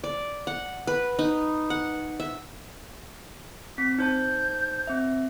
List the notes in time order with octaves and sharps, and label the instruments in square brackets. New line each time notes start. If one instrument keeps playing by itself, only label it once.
[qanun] D5
F#5
B4
D#4
F#5
E5
[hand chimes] C4 [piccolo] B6
[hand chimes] D#4 C5 A5 [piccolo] G6
[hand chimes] C4 E5